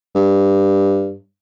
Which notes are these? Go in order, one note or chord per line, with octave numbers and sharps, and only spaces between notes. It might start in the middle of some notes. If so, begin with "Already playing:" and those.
G2